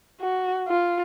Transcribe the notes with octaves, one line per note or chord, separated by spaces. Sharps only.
F#4
F4